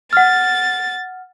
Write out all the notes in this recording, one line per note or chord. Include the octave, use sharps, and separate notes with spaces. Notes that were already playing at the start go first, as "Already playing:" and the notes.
F#5 F6 A6